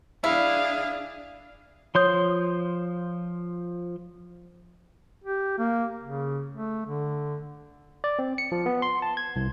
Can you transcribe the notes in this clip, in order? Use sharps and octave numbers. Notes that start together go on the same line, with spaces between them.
D4 E4 G#4 F5
F3 C#5 C6 D#6 G6
G4
A#3
C#3
A3
D3
D5
C4
C#7
F3
B3
C6
A5
G#6
C2